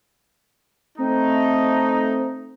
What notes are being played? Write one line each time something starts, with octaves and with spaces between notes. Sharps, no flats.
A3 C4 D#4